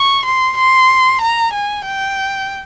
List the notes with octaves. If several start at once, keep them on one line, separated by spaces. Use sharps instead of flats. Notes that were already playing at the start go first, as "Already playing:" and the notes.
Already playing: C#6
C6
C6
A#5
G#5
G5